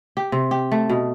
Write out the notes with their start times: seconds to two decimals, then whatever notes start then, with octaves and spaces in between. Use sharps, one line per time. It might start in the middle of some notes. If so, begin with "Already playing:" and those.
0.17 G4
0.32 C3
0.51 G4
0.72 A3
0.89 B2